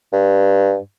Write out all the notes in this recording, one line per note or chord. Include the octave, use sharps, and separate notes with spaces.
G2